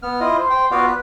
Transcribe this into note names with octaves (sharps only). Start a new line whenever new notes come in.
B3 F6
E4 F4 D#5
C5
C5 G5
B3 F4 F#4 D5 F5
B4